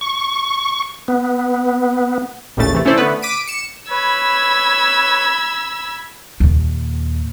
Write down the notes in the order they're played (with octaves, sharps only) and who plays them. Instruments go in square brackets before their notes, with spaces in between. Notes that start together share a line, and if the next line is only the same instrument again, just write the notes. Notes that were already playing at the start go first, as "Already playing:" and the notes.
[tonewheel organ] C#6
B3
[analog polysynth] A1 D#2 A#2 C#3 A3 A6
C3 E3 A3
A3 C#4 E4 A4 C5 D5
D3 A3 B3 B4
D6 B6 D7 D#7
C#7 E7
[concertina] B4 C#5 [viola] B5 [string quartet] E6 G#6
[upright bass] D#2 A#2